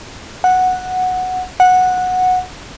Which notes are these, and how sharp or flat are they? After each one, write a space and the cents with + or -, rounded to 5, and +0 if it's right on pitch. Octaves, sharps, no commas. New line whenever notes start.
F#5 -5
F#5 -10